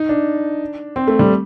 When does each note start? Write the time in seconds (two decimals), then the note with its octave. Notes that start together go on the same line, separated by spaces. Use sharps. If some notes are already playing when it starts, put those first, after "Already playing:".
Already playing: D#4
0.09 D4
0.96 C4
1.08 A3
1.19 G3